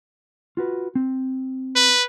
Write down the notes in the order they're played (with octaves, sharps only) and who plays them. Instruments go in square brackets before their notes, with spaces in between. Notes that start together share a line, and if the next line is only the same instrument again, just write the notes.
[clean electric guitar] F4 F#4 B4
C4
[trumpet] B4